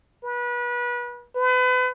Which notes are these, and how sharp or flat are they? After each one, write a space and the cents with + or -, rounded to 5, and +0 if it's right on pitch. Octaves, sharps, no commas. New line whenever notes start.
B4 -30
B4 +35